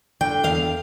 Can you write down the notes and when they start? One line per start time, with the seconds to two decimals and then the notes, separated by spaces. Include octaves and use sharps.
0.21 D3 G5
0.44 E2 F5